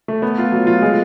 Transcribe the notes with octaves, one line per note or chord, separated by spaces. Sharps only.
A3
B3
F4
F#3
F4
G#3